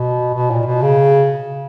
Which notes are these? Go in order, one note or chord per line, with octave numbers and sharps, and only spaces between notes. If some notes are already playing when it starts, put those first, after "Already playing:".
Already playing: B2
B2
A#2
B2
C#3